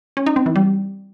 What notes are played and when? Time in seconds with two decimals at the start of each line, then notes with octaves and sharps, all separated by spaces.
0.17 C#4
0.26 D#4
0.36 C4
0.46 E3
0.56 G3